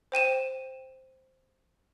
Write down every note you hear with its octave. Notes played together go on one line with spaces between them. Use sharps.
C5 G5 D#7 E7